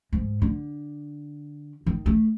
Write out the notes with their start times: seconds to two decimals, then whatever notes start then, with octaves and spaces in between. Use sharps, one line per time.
0.13 G#2
0.42 D3
1.86 D#3
2.06 A3